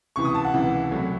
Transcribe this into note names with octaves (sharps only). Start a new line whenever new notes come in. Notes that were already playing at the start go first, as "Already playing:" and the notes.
C#2 C3 E3 C#6
D#6
A5
F#5
C#2 C3 E3
C2 C3 F#3 A3